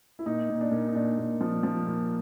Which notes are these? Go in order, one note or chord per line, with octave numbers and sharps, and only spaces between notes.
E4
A#2 D#4
A#2
D4
A#2
D#4
A#2 D4
A#2
F3
F3
A#2